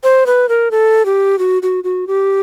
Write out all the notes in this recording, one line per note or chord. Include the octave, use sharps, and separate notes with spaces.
C5
B4
A#4
A4
G4
F#4
F#4
F#4
G4